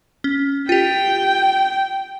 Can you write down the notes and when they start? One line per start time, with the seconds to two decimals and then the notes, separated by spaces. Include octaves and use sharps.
0.24 C#4
0.69 F4 G4 G5